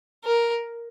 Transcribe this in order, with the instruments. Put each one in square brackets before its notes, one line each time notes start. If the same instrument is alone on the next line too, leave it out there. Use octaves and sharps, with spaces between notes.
[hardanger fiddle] A#4